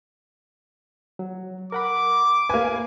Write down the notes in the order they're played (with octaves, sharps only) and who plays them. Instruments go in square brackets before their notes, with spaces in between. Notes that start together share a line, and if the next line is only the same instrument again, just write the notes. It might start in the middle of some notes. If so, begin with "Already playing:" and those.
[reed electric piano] F#3
[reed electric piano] A#4 F#5 B5 [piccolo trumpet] D6
[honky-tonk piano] A#3 G#5 [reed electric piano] B4 F5